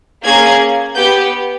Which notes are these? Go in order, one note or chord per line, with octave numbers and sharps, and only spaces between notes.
A#3 C#4 G#4 G#6
B3 G4 G6